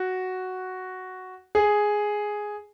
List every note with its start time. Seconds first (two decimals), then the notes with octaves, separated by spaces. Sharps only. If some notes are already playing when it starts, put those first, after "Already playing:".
Already playing: F#4
1.55 G#4